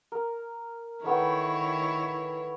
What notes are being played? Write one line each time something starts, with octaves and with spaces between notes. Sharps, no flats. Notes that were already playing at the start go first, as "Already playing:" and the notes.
A#4
D#3 A3 B3 E4 C#5 G5